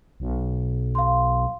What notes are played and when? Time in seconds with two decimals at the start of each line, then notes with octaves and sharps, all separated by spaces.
0.20 B1
0.95 F5 C6